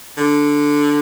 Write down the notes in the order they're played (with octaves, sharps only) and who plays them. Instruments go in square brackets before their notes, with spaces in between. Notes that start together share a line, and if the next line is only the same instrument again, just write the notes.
[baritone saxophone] D3